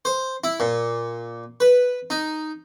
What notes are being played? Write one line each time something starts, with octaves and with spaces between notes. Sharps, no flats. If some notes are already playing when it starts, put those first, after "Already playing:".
C5
E4
A#2
B4
D#4